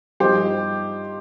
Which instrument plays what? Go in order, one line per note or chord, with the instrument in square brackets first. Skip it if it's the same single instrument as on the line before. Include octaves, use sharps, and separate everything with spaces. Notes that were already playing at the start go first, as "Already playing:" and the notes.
[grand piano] G2 F3 D#4 G4 C5